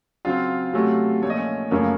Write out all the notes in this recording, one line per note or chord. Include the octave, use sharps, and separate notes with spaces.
C#3 F#3 C4 F4 F5
C3 F#3 A3 C#4
A#2 F3 A3 C#5
D#5
C#4 C#5
F#2 C#3 F3 A3 A#3 C#4 A#4